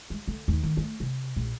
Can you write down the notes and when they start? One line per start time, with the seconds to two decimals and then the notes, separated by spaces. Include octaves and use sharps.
0.10 G#3
0.28 D3
0.48 D#2
0.63 D#3
0.77 A3
1.00 C3
1.36 A#1